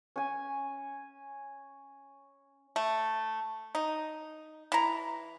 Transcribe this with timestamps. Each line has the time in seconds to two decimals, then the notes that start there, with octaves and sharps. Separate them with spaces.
0.16 C#4 G#5
2.76 A3
3.75 D#4
4.72 E3 A#5